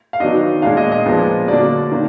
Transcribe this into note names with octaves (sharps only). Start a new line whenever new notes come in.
F5
D#3 F#3 B3 D4 D#5
A#2 G#3 D4 F5
D#5
D#5
A#2 F3 G#3 B3 D4
D3 F#3 A#3 D4 D5
D#3 A#3 D4